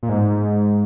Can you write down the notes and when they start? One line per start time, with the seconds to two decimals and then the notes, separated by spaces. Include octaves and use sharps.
0.03 A#2
0.09 G#2